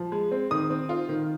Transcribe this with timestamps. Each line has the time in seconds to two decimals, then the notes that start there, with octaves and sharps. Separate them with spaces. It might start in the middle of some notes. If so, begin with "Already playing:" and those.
Already playing: F3
0.12 G#3
0.31 C4
0.51 D#3 D#6
0.70 C4
0.89 F4
1.09 D#3